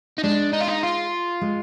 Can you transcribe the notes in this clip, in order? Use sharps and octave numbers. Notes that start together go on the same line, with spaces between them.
D#4
G#3 D4
D#4
F4
D#4
F4
G#3